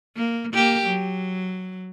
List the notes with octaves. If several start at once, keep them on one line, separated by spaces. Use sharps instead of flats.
A#3
A#3 G4
F#3